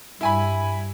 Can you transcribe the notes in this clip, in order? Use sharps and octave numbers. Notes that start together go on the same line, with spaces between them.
G2 E4 G#5 B5